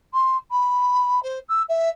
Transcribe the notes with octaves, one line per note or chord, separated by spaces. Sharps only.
C6
B5
C5
E6
E5